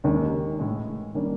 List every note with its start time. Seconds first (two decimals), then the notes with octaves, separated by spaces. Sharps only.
0.04 D#2 D#3 G#3 C#4
0.59 A2 E3 G#3
1.14 D#3 G3 A#3 C#4